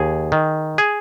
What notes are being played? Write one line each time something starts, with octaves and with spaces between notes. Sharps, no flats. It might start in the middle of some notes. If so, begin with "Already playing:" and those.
Already playing: D#2 G#4
D#3
G#4